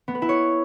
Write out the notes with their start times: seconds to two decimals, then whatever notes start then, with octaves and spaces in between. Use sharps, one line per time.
0.08 B3
0.15 B4
0.22 E4
0.29 C#5